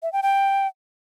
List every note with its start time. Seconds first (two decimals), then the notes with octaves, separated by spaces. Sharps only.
0.03 E5
0.13 G5
0.23 G5